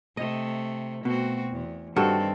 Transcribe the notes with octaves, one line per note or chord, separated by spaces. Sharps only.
C3 A3 D#5
B2 A3 C4 F#4
E2
G2 D#3 C4 F#4 A4